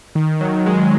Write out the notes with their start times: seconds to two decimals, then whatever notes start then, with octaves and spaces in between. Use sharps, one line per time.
0.15 D#3
0.41 F#3
0.66 G#3